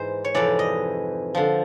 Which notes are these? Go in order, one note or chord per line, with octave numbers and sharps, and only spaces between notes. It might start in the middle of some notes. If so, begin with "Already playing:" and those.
Already playing: G#2 E3 C5
C#5
F2 C3 E3 D5
D#5
D3 F3